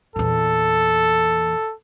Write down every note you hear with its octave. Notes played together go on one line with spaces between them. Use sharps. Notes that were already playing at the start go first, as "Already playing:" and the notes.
E2 A#2 A4